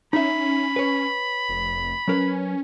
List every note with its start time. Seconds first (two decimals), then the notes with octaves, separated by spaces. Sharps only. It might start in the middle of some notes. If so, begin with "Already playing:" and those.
0.13 C#4 D#4 E5 B5
0.76 B4 C#5
1.49 F1
2.08 F#3 C#4 A#4 B4